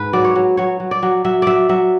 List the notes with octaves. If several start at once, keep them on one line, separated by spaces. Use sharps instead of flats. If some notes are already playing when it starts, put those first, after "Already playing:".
Already playing: G#2 B4
F#3 D5
C#5
F#3
F#3 C#5
F#3
D5
F#3
F#3 E5
F#3 D5 E5
F#3 E5